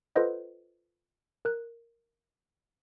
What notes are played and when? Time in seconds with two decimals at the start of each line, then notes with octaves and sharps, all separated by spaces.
0.16 F4 A4 B4 C5 D#5 F#5
1.45 A#4 F#6